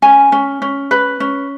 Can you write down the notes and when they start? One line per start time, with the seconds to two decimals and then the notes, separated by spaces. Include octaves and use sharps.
0.02 C#4 G#5
0.32 C#4
0.62 C#4
0.91 B4
1.20 C#4